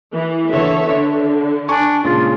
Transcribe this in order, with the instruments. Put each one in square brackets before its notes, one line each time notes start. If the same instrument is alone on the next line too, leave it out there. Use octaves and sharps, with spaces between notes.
[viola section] E3
[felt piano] D3 E3 B3 [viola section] A4 C#5 E5
[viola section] D3 [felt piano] D4
[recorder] D4 [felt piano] G#5 C#6
[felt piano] A#2 C#3 G#3 [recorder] F4